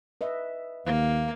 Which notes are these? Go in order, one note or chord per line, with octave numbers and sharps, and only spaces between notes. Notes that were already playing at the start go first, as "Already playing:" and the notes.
B4 D#5 E5
D#2 A#3 F5